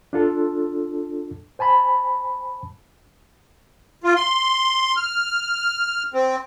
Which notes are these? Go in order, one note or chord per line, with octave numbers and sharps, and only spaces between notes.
D4 F4 A4 A5
C5 G#5 A5 B5
F4
C6
F6
C4